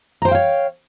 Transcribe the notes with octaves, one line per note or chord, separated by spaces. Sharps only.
C5 C#5 F5 G5 A#5